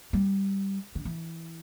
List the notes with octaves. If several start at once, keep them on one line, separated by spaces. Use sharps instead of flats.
G3
D3
E3